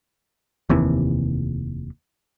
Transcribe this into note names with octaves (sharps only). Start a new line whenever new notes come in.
F1 D#2 C3 E3